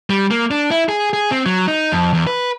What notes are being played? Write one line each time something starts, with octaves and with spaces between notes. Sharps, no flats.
G3
A#3
D4
E4
G#4
G#4
C4
F#3
D#4
F2
E2
B4